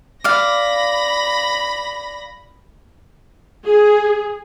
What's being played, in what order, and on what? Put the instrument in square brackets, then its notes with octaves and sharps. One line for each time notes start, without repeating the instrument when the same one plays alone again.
[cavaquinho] D5 F5 [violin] B5 A#6
[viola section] G#4